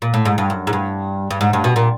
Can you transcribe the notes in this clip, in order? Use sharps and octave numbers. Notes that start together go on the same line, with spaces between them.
A#2
A2
G#2
G2
F#2
G#2
G2
G2
G#2
G2
B2
A#2